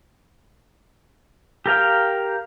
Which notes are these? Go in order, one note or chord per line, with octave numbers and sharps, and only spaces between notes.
G4 A#4 F5 G5